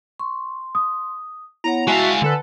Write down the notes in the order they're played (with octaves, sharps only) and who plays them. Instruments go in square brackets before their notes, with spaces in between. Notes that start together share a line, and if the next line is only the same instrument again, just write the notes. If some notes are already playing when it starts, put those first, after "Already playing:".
[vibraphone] C6 [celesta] C#6
[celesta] D#6
[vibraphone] B3 C#5 F#5 [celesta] E4 [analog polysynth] A#5
[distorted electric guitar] G#3 F5 [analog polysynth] F#4 E5 A5 [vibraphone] G#5
[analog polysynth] D3 A4 B4